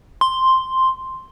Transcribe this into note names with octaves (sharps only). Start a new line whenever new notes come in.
C6